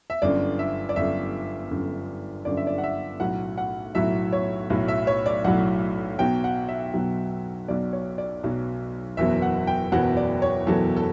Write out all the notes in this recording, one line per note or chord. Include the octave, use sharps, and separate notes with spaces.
E5
G1 F#2 D3 D5
E5
D5
G1 F#2 D3 E5
G1 F#2 D3
G1 F#2 D3 D5
E5
D5
F#5
E5
B1 A2 F#3 F#5
F#5
B1 A2 F#3 E5
C#5
B1 A2 F#3
E5
C#5
D5
B1 A2 F#3 F#5
B1 B2 F#3 G5
F#5
E5
B1 B2 F#3
B1 B2 F#3 D5
C#5
D5
B1 B2 F#3
F#1 E2 B2 F#3 E5
F#5
G5
F#1 E2 B2 F#3 F#5
D5
C#5
F#1 E2 B2 F#3 A4
A4